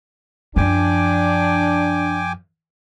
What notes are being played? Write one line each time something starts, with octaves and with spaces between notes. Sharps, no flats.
F#2 F3 D4 G5 G#5 D6